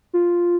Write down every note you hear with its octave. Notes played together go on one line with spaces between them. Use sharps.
F4